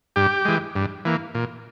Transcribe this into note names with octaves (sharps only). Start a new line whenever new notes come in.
G2 G4
E3 G#3
G2
E3 A#3
A#2